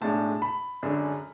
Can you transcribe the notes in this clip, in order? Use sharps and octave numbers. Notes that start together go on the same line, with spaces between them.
B1 A2 G#3 D4 A5
B5
F#2 D3 G#3 D4